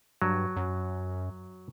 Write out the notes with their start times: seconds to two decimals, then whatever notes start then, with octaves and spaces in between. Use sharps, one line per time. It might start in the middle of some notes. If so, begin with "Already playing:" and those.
0.22 G2 F#3
0.56 F#2